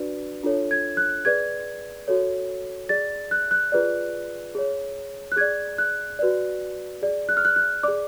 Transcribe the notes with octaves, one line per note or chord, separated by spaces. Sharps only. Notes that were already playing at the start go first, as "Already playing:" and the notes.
Already playing: D4 F#4 B4 D5
D4 F4 A4 C#5
G#6
F#6
G#4 B4 D5 G#6
F#4 A4 C#5
G#4 D5 A6
F#6
F#6
F4 G#4 B4 D5
G#4 C#5
F#6
G#4 D5 G#6
F#6
F#4 B4 D5
G#4 D5
F#6
F6
F#6
F#6
G#4 D5 D6